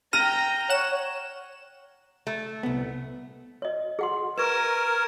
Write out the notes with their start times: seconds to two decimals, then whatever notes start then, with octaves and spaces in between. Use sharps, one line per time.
0.13 G5 A#5 F6 A#6 D#7
0.70 C#5 F#5 E7
2.27 A3
2.63 C2 B3
3.62 C#5 D#5
3.99 G#4 F#5 C6
4.38 A#4 B4 C#6 G#6 E7